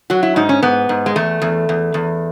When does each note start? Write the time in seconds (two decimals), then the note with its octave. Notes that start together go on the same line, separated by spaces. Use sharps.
0.10 F#3 F#4
0.23 E4
0.36 G#2 D#4
0.49 C#4
0.63 G#2 B3
0.89 G#2
1.06 G#3
1.16 E2 A3
1.42 E2
1.69 E2
1.94 E2